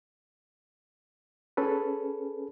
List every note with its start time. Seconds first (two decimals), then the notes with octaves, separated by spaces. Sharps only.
1.57 C#4 G#4 A4 B4